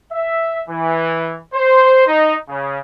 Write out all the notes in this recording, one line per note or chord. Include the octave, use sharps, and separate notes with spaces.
E5
E3
C5
D#4
C#3